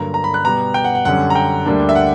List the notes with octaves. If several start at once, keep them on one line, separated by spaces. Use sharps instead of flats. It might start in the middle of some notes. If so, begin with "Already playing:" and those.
Already playing: G2 D3 F#3 A#3 A#5
A#5
B5
F#6
B2 G3 B3 A#5
G5
F#5
F#5
F#2 D3 G3 C#4 F#5
A#5
G5
D2 D3 G3 A#3 D4
E5
F#5